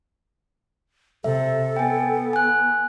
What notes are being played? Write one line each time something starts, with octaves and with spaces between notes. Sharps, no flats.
C3 A4 E5
B3 G5 G#5
G#5 F#6